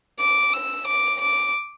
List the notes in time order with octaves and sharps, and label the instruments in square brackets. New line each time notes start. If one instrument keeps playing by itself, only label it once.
[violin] D6
E6
D6
D6